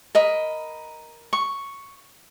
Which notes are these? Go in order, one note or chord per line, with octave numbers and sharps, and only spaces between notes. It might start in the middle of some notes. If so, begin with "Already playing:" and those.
A#4 D#5 B5
C#6